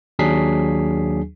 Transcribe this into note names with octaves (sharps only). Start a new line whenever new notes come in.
D#2 F#3 D4 G#4 B6 C7